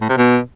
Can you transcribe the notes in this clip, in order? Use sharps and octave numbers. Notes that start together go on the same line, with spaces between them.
A2
C3
B2